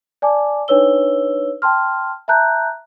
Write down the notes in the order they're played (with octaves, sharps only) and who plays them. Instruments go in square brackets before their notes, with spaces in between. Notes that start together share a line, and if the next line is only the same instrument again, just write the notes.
[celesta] D5 G#5 A5 D6
D4 D#4 B4 C#5 E6 G7
G5 A5 C6 F6
E5 A5 A#5 F#6 G6